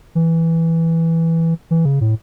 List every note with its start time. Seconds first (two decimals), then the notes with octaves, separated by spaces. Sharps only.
0.15 E3
1.71 E3
1.85 C#3
2.01 A2